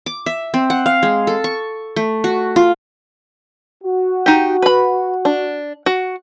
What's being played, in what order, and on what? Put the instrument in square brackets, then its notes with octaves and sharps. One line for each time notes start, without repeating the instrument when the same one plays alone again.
[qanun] D6
E5
C4
F#5
F5
G#3
A4
C#6
A3
F#4
F4
[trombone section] F#4
[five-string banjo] D#4 G4
B4 B5
D4
F#4